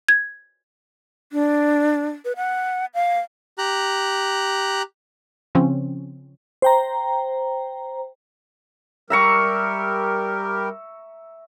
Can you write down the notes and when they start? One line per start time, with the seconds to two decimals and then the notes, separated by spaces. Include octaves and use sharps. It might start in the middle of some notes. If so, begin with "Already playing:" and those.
0.09 G#6
1.32 D4
2.25 B4
2.36 F#5
2.94 F5
3.58 G4 A#5 F#6
5.55 C#3 F3 C4 C#4
6.62 C5 G5 A#5
9.10 G3 G4 A#4 E5 A#5 C#6